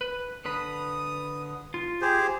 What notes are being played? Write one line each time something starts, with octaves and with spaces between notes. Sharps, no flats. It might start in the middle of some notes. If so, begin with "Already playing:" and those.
B4
D3 B4 B5 D#6
F4
G4 G#4 C5